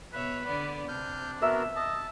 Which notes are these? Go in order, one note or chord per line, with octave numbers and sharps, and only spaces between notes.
B2 B4 C#5 E5
D3 B3 D5
C3 D4 F6 G6
B3 F#4 A#4 E5
D#5 A5